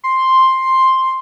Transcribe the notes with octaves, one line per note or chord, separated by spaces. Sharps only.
C6